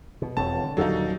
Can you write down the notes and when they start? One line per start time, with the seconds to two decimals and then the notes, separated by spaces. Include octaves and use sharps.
0.22 B2
0.37 E1 F2 C4 C#5 A5
0.64 D3
0.77 D#1 F#3 D#4 A4 F5